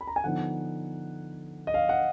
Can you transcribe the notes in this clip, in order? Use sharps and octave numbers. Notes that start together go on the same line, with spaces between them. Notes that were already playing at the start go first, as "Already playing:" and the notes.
B5
A#5
G#5
D3 F3 B3 D#4 F#5
D#5
F5
F#5